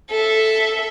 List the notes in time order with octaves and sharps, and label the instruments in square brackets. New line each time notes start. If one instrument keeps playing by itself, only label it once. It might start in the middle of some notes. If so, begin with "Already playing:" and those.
[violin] A4 E5